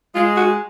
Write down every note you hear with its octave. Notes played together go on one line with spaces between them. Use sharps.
G#3 F4
F#4